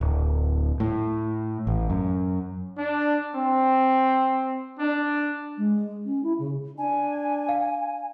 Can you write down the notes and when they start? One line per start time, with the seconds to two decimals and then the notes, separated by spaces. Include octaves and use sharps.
0.01 D1
0.80 A2
1.67 A1
1.90 F#2
2.78 D4
3.35 C4
4.79 D4
5.57 G#3
6.05 C#4
6.23 E4
6.39 C#3
6.77 D4 G#5
7.49 F5